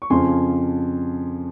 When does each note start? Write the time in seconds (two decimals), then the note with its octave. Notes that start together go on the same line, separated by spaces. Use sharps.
0.02 C#6
0.10 F2 C#3 F3 G#5 C6